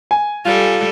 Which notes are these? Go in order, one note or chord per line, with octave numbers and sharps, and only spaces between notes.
G#5
G3 F4 A4 D5